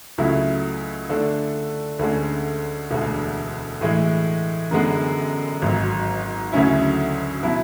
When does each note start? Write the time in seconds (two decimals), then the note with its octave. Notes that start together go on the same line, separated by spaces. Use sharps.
0.18 C#2 C#3 F#3 A3 E4
1.09 D3 A3 D4 A4
1.99 D2 D3 G#3 C#4
2.91 E1 D2 D3 G#3
3.81 A2 E3 G#3
4.71 F#2 D3 G#3 B3
5.62 G#1 G#2 F#3
6.52 D2 C#3 F#3 C#4 E4
7.43 B2 F#3 B3 E4